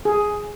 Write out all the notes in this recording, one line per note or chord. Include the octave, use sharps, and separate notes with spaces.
G#4